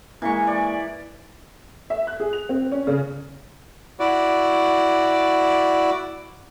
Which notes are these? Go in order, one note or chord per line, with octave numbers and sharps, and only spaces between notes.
E3 G#3 A#3 C#6
D5
E5
F#6
G#4
F7
C4
C#4
C#3
E4 F#4 D5